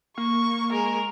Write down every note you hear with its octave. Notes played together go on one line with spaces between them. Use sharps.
A#3 C#6
G#3 A#4